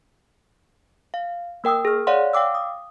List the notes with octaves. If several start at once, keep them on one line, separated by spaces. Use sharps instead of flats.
F5
A#3 A#4 G5 D#6 E6
G#4 F6
C#5 D5 F5 F#5 C6
F5 G5 D6 E6
D#6